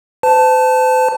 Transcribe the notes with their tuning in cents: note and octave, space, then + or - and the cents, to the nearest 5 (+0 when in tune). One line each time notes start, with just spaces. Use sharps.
C5 -45 A5 +0